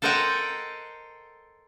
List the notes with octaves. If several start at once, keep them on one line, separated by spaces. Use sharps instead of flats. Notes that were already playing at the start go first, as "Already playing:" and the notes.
A4 A#4 C5 D#5 F#5 G5